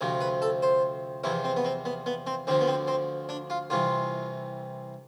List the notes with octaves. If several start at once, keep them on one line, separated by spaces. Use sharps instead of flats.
D2 C3 F3
B4
A4
C5
E2 C3 F3 E4
C4
B3
C4
B3
B3
C4
D2 D3 F3 C4
B3
C4
C4
D4
F4
C2 C3 E3 F4